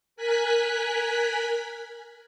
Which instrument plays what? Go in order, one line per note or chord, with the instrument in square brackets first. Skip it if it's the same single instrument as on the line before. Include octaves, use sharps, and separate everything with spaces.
[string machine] A#4 G#5 F#6 B6